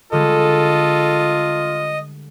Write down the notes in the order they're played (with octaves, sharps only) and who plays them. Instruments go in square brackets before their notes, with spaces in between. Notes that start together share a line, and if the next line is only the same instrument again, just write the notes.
[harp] D3 G3 G#3 [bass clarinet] F4 [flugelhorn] A4 [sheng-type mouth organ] D#5